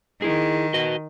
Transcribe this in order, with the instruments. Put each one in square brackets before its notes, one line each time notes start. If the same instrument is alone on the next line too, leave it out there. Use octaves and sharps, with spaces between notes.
[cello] D#3 [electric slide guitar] E4 G#4
[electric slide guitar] F#4 B4 D#5